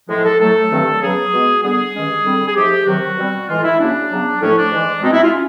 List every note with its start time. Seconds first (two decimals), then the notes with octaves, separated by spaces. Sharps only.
0.09 A2 F3 G#3
0.24 A4
0.40 A2 F#3 A3 A4
0.70 G2 D#3 F#3 A3 C4
1.01 C#3 F#3 B3 G#4
1.33 B2 G#3 B3
1.63 D3 G3 B3 G#4
1.94 G2 D#3 G#3 C#4
2.24 D3 G3 C4
2.46 G#4
2.55 G#2 F3 A3 G4
2.86 C3 D#3 F#3 F#4
3.17 B2 G3 C4
3.48 A2 E3 G#3 F4
3.63 E4
3.79 C#3 F#3 A#3 C#4 D4
4.10 C#3 F#3 B3
4.41 A2 F3 A3 C#4
4.56 D4
4.71 G#2 E3 G#3
5.02 B2 G#3 C4 D#4
5.12 E4
5.23 F4
5.33 C#4